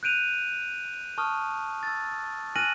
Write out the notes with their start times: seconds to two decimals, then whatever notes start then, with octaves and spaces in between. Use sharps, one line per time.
0.03 F#6 G6 D7 D#7 F7
1.18 A5 C#6 D#6 F6
1.83 E6 A6
2.56 G#5 F6 F#6 A#6 D#7 F#7